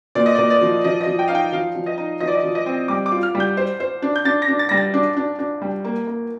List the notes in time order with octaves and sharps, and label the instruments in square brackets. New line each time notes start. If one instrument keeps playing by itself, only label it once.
[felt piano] A#2 [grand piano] D5
[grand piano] D#5
[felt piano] A#2 [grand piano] D5
[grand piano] D5
[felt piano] F3
[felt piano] F3 [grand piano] D#5
[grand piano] D#5
[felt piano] F3
[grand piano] G5
[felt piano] D#4 [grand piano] F5
[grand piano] G5
[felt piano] F3 [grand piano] F5
[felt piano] F3
[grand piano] D#5
[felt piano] D#4
[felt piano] F3 [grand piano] D#5
[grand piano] D5
D#5
[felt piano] F3
[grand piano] D#5
[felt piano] C4
[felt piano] G3 [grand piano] D6
[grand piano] D6
[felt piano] F4
[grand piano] F6
[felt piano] G3
[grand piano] G6
[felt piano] C5
C5
D4
[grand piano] G6
[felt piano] D4 [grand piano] A6
[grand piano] A#6
[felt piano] D4
[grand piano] A6
[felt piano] G3 [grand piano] A#6
[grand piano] A6
[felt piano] D4
D4
D4
G3
A#3
A#3